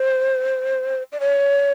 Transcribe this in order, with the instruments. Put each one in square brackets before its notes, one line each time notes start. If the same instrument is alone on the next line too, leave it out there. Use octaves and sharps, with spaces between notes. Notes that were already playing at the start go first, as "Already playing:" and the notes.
Already playing: [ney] C5
D5
C#5